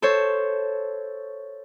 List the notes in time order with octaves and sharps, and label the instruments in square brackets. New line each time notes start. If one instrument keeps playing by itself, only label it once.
[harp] A4 C5 C#5